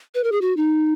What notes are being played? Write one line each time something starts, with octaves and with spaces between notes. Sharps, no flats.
B4
A#4
G#4
F#4
D#4